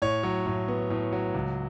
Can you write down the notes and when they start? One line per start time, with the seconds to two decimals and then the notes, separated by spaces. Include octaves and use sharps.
0.02 A2 C#5
0.23 F#3
0.46 A2
0.68 B3
0.90 A2
1.12 F#3
1.34 C#2